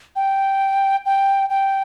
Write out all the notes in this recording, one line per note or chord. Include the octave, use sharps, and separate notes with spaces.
G5
G5
G5